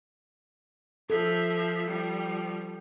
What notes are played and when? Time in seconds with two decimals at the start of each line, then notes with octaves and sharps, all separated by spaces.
1.10 F3 A4 E5
1.87 F3 G3